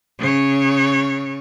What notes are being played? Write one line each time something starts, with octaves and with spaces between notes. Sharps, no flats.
C#3 C#5